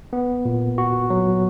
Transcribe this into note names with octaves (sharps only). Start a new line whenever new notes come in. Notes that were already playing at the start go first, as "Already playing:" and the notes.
B3
A#2
F#4
F#3